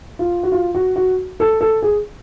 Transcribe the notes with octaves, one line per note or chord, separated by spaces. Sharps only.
F4
F#4
F4
F#4
F#4
A4
A4
G#4